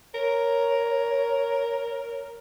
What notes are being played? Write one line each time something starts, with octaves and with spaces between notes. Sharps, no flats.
A#4 C#5